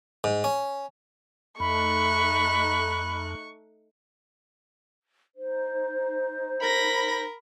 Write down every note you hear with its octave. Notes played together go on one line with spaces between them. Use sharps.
G#2
C#4
F2 A3 D#4 B5 C#6 F#6
D#4 C5
A#4 B5 A#6